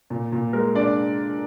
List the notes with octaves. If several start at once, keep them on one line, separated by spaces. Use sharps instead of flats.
A#2
A#2
G#3 A#4
D4 D5